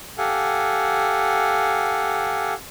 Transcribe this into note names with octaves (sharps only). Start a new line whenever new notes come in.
G4 A4 F5 F#5 G#5